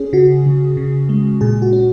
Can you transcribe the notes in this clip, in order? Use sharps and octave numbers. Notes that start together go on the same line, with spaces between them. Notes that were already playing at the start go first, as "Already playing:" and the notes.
Already playing: C#4 G#4
C#3 F#4
C#3
C#3
G#3
A#2 G#4
F#4
C#4